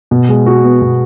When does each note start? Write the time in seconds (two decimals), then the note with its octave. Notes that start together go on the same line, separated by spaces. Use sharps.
0.11 B2
0.29 G#3
0.46 F#4
0.64 B3
0.82 B2